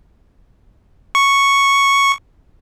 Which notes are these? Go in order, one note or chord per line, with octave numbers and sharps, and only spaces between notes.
C#6